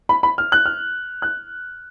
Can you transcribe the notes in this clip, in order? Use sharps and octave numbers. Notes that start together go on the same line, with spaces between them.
B5
B5
F6
F#6
F6
F#6